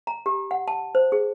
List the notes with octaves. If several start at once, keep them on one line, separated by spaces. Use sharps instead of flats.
A#5
G4
F#5
A5
C5
G#4